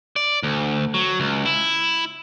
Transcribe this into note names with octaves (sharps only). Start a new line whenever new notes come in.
D5
D2
F#3
C#2
E4